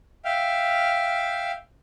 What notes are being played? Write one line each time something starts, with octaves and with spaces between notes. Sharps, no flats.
E5 F5 G5 F6